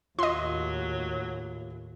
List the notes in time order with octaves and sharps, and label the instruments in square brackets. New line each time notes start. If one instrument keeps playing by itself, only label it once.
[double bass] D#2 A2 [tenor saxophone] F#3 [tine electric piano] F4 [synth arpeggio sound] D#5 C6